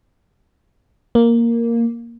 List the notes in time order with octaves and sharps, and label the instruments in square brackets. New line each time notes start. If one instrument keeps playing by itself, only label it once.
[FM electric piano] A#3